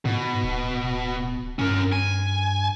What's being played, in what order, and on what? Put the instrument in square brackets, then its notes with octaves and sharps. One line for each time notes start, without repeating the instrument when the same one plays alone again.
[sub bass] G#2 [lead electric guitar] B2
[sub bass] D1
[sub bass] G2 [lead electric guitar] C#4 A#4
[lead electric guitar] G#5